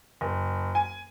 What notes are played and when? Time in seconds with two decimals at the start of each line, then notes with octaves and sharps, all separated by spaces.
0.21 F#1
0.75 G#5